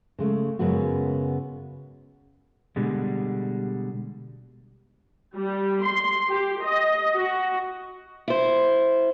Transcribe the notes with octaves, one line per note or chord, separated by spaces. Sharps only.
C#3 G#3 A3
F#2 C#3 G#3 B3 F#4
B2 D3 G3 G#3
G3
C6
G4
D#5
F#4
E4 C5